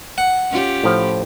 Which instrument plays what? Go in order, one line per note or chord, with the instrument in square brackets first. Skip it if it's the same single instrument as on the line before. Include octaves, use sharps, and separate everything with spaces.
[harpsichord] F#5
[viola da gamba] C#4 F4 G4
[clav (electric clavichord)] A2 F3